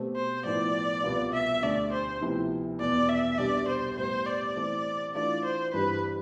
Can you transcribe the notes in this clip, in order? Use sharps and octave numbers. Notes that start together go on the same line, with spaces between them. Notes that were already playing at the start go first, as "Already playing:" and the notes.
Already playing: B2 A3 C4 G4
C5
A2 F3 B3 E4 D5
C2 B2 B3 F4
E5
D2 D3 A3 D5
C5
D2 C3 F3 B3 E4
E2 B2 B3 D5
E5
C2 B2 G3 D4 D5
C5
A2 G3 B3 C5
D5
E3 A3 C4
E3 A3 D4 F4 D5
C5
G2 E3 G3 C4 B4